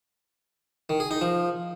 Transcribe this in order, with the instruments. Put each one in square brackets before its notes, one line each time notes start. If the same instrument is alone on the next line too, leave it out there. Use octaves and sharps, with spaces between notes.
[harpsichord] D#3
G#4
D#4
F3